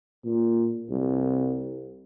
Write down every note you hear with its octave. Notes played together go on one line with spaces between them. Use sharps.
A#2
C2